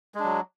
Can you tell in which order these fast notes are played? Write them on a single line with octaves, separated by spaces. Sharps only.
G#3 D4 F#3